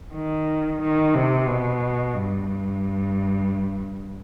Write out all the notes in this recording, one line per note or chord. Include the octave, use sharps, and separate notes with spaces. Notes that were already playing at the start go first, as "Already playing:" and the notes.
D#3
D#3
C3
B2
G2